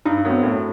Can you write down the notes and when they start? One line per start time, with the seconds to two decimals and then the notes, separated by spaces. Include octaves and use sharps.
0.05 G2 D#4
0.25 F#3 B3
0.31 C4
0.43 A2